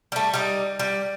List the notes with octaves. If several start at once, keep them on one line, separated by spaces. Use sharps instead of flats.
G3 A3
G3 D#4
G3